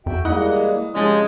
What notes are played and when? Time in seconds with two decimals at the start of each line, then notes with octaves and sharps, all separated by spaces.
0.06 F2 F#4 E5 G5
0.25 G3 G#3 A#3 E4 D#5 F#5 D#6
0.56 E3
0.95 C3 F3 G#3 C#4